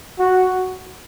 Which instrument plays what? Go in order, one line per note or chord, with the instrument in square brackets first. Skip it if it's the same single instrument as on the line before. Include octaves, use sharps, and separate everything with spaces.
[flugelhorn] F#4